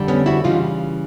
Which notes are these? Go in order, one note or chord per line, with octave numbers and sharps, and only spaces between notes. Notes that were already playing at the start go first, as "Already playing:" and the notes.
Already playing: F2 D3 G3
B3 C#4
E4 F#4
C#3 E3 G3 D#4 F4